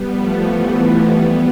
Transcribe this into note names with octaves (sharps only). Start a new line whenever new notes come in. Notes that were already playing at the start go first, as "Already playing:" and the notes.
Already playing: G3 B3
F3 A3
E3 G3
E3 G3
G3 B3